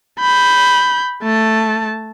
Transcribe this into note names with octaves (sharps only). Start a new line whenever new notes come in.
B5 G6
A3 A5